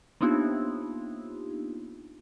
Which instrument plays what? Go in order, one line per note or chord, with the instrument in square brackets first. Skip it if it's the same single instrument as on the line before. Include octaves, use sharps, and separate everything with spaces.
[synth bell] A#3 B3 D4 D#4 F4 G4